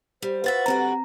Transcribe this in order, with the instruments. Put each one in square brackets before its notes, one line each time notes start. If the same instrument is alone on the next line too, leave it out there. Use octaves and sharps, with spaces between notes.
[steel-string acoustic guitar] G3 [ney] C5
[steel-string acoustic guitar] F4 F#4 E5 [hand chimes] B4 A6
[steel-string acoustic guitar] D3 G3 F#4 [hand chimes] C4 A#5